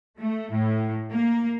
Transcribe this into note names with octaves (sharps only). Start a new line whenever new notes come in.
A3
A2
A#3